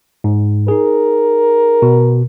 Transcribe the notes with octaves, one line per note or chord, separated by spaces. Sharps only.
G#2
D#4 G#4 A#4
B2